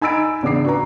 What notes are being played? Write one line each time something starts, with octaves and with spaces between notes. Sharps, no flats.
D#4 G#5 B5 E6 A6 D7
E2 C#3 D4 D6 C7
F#4 B4 A#5